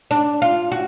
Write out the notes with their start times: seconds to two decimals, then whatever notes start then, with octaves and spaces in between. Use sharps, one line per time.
0.11 D4
0.42 F4
0.72 F#4